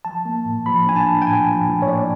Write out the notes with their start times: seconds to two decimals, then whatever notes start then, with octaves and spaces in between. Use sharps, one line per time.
0.05 F3 A5
0.25 A#3
0.45 A2
0.66 F3 B5
0.87 D4 G#5
0.96 A5
1.07 D4
1.22 G5
1.27 A2 G#5
1.47 F3
1.68 A2
1.82 C#5
1.88 A#3 D5